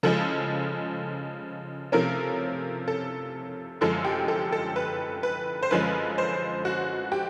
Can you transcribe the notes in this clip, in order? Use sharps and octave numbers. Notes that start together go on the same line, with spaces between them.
C#3 F3 G#3 A4
C3 F3 A3 C#4 A#4
A4
F#2 D3 F3 G#3 A4
G4
A4
A4
B4
B4
C5
F#2 D3 F3 G#3 C#4 B4
C5
F#4
G4